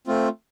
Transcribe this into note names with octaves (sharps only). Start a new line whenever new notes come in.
A3 C4 F4